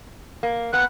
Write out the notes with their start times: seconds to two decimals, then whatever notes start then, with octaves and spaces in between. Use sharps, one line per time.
0.43 A#3
0.73 A#2 B3 F#6